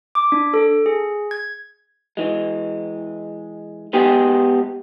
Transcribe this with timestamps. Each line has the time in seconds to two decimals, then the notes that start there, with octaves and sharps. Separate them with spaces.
0.15 D6
0.32 D4
0.54 A4
0.86 G#4
1.31 G#6
2.17 E3 G#3
3.93 G#3 B3 G4 G#4